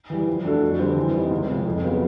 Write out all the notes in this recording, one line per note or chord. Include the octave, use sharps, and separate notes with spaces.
E3 G3
F3
A3 D4 F#4 A4
F2
D3 G3 C4
E3
G3 C4 D#4
C#2
C3 F3
F2
C#3 F#3 B3